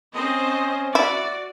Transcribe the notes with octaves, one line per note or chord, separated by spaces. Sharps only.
C4 C#4 C5 D#5
E4 F#4 D5